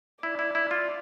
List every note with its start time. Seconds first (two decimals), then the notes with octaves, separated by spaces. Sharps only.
0.23 E4 D5
0.39 E4
0.55 E4
0.71 F4